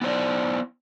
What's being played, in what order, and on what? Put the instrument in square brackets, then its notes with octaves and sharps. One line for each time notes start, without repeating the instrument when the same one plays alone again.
[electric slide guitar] B3 E4 C5 D5